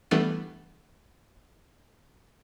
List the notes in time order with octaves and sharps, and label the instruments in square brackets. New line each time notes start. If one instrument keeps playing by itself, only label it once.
[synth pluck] E3 G3 A3 B3 D4